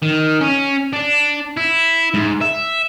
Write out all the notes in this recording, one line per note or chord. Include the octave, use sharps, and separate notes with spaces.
D#3
C#4
D4
E4
G#2
E5